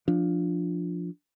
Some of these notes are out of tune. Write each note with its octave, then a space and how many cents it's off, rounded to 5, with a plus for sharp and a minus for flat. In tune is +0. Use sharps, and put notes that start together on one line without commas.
F3 +0 D4 +0